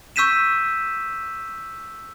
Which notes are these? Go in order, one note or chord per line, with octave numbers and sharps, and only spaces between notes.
C#6 E6 G6 B6 D#7 E7